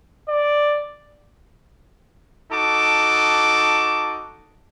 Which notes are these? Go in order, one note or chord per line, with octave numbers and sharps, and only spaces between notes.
D5
D#4 F#4 A4 A5 D6